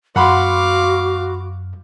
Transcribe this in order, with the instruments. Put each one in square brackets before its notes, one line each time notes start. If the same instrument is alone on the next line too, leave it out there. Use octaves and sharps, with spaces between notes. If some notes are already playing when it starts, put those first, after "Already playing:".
[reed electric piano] F#2 [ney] F#4 [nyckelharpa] F5 D6 [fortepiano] F#5 B5 C6